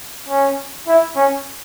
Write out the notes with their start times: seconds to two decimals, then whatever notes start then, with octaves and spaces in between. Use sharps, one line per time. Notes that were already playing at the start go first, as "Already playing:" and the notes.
0.28 C#4
0.87 E4
1.16 C#4